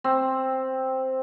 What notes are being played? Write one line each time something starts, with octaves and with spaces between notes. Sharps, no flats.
C4